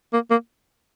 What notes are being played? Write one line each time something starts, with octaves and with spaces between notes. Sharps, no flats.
A#3
A#3